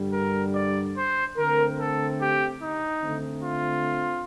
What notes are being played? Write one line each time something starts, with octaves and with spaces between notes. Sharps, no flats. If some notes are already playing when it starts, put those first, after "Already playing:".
Already playing: G2 D3 G3
A#4
D5
C5
D3 A3 C4 A#4
A4
G4
D#4
D3 A3 C4
F4